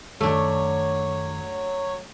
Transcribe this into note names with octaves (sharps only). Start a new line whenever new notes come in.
F#2 D#3 F#3 A3 D4 C#5